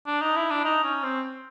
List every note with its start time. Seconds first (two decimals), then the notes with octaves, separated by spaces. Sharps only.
0.07 D4
0.22 D#4
0.36 E4
0.51 D4
0.65 D#4
0.84 C#4
1.04 C4